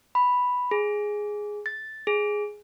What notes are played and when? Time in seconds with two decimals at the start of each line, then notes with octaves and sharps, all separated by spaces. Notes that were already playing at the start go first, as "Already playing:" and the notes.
0.15 B5
0.71 G#4
1.66 A6
2.07 G#4